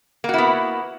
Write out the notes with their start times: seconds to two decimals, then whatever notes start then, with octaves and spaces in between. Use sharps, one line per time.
0.24 A#3
0.29 F#4
0.34 E4
0.38 B3